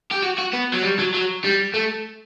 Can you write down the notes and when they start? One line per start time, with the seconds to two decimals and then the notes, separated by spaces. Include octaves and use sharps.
0.11 G4
0.23 F#4
0.38 F#4
0.53 B3
0.73 F#3
0.83 G3
0.99 F#3
1.14 F#3
1.44 G3
1.74 A3